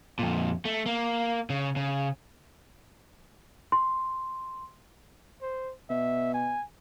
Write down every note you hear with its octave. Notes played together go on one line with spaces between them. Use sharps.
F2 A#2
A3
A#3
C#3
C#3
C6
C5
B2 E5
G#5